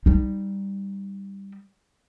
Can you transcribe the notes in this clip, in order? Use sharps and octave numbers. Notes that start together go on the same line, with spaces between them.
G3 D#4